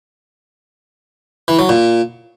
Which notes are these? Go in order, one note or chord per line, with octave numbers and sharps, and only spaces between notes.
E3
F#3
A#2